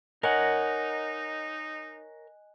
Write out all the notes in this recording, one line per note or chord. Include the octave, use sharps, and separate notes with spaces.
D#4 A#4 C#5 D#5 F#5 G#5 F#6